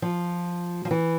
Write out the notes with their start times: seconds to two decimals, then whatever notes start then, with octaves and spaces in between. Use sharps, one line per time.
0.02 F3
0.85 F3
0.91 E3